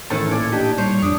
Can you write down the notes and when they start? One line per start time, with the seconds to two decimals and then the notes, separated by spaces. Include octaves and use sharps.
0.10 A2 D#3 E3 C#4 E4 A4 C5 A5
0.31 A#2 D5 G#6
0.53 D4 D#4 G4 A5
0.78 G3 C5 C#5
1.02 F2 D4 D#6